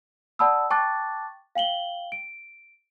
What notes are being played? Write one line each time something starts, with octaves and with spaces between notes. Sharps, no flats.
D5 F#5 A5 B5 D#6 E6
G5 A5 C#6 D6 F#6 A6
F5 G5 F#7 G7
D7